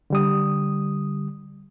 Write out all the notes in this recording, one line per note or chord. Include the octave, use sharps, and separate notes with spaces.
D3 G3 D#6